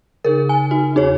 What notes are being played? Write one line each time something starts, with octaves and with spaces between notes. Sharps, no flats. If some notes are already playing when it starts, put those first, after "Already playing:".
C#3 D#4 G#4 A#4
G#5
D#4 F#4
E2 D#4 G#4 C#5